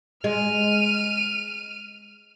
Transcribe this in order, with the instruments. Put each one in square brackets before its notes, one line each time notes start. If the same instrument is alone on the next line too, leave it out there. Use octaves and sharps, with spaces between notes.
[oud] G#3 [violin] F6 D#7